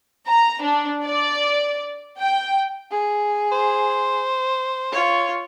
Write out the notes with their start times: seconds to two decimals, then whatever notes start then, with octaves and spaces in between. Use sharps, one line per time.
0.27 A#5
0.62 D4
1.05 D5
2.19 G5
2.91 G#4
3.52 C5
4.92 F4 C#5